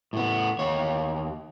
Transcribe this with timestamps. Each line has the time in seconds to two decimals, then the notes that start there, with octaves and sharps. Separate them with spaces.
0.13 A2 B3
0.59 D#2 C#5